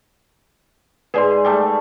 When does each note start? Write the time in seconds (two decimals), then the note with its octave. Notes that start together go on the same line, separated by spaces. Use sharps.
1.14 G#2 G#4 B4 D5 C6
1.45 G3 A3 A4